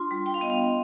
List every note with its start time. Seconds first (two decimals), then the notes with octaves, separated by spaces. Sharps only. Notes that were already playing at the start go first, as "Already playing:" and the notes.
Already playing: D4 F4 C6
0.11 G3
0.26 G5
0.34 F5
0.41 B3 D#5
0.50 F5